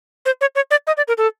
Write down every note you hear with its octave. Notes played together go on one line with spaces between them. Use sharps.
C5
C#5
C#5
D5
D#5
D5
A#4
A4